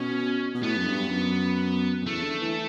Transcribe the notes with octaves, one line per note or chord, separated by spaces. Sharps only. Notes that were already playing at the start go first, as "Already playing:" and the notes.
Already playing: B2 C#4
B2
A2 B3
F#2
G2
F#2
F#2
E2 A3
D3
E3